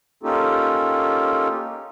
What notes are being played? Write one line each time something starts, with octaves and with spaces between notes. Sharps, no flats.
A#3 C#4 D#4 F4 G4 A4